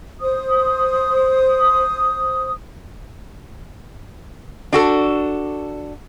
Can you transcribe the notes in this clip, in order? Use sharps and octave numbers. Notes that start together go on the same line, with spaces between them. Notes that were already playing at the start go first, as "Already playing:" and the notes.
C5 D#6
D4 F#4 A4